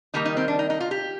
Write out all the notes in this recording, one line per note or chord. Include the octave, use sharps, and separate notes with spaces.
D#3 G3 A#3 D#4
D#4
C4
D4
D#4
D#4
F4
G4